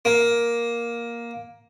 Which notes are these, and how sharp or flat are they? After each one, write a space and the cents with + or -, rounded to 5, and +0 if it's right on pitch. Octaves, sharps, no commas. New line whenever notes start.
A#3 +10